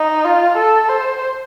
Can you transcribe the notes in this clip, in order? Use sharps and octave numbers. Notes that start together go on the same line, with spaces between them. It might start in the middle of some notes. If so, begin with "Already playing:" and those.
Already playing: D#4
F4
A4
C5